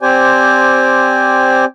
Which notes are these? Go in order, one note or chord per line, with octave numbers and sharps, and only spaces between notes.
C4 G4 C5 D5 G#5